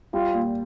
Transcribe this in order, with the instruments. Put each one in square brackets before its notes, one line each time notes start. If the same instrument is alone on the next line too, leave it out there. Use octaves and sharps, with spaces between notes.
[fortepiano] G3 [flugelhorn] F4
[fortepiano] A#2